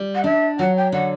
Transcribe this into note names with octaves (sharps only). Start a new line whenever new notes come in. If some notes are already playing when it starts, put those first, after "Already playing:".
Already playing: G3
F#5
D4 E5
F#3 F#5
G5
D3 F#5